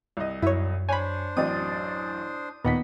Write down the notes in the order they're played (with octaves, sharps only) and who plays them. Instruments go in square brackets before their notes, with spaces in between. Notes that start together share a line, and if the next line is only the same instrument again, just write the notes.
[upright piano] C2 D#5
[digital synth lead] F#2 [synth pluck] E4 C#5
[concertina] D4 C5 [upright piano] C#5 [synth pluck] G#5 B5
[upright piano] A1 F#2 D5 [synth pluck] C4 [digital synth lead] D#6
[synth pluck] D#2 A#2 [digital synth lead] B3 [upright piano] D#4 F#5 B6